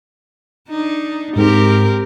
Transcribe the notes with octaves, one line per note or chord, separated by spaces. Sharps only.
D4 D#4
G#2 C4 G4 A#4